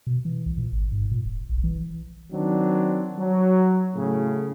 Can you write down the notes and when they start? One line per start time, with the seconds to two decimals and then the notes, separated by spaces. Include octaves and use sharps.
0.07 B2
0.25 E3
0.46 C2
0.58 A#2
0.72 G#1
0.92 G#2
1.11 A#2
1.26 E1
1.49 B1
1.64 E3
2.32 D#3 F#3 C4 D4
3.18 F#3
3.95 A2 C#3